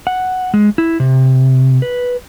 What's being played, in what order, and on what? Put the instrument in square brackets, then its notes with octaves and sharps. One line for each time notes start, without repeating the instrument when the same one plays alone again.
[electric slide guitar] F#5
G#3
E4
C3
B4